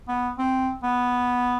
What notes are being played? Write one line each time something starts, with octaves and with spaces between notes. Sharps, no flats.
B3
C4
B3